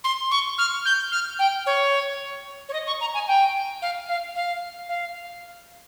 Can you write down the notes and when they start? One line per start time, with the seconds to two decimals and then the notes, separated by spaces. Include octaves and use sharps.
0.04 C6
0.31 C#6
0.58 F6
0.85 G6
1.12 F6
1.39 G5
1.66 C#5
2.69 C#5
2.73 D#5
2.87 C#6
3.01 A#5
3.14 G#5
3.28 G5
3.82 F5
4.08 F5
4.36 F5
4.89 F5